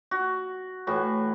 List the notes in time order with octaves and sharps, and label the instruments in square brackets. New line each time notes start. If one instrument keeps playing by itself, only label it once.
[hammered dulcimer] F#4
A2 E3 F#4